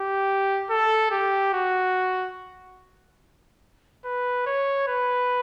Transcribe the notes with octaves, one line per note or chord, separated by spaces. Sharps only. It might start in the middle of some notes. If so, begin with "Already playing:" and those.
Already playing: G4
A4
G4
F#4
B4
C#5
B4